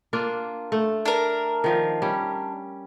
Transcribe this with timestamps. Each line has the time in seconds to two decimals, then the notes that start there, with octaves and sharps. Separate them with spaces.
0.13 A#3 D4 F4
0.72 A3
1.06 D4 A#4
1.64 D#3 F3 F5
2.02 G3 C#4